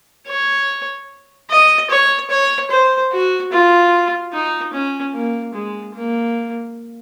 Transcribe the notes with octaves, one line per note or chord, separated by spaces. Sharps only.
C#5
D#5
C#5
C#5
C5
F#4
F4
D#4
C#4
A#3
G#3
A#3